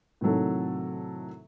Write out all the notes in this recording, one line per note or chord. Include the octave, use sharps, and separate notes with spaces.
A2 C3 D#3 F#3 A4